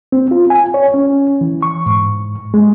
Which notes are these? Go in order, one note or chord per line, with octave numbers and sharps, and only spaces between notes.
C4
F4
G#5
C#5
C#4
E3
C#6
G#2
G#3